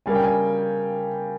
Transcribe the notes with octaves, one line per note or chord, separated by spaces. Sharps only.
C#3 G3 A#3 G#5
G5
G#5